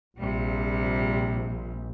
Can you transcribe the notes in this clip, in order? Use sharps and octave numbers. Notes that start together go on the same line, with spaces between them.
A#1 C3 G3